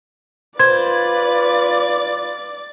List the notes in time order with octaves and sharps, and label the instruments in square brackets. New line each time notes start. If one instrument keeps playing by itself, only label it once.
[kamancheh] F4 B4 [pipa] C5 [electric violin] D5 A6 [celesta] G#6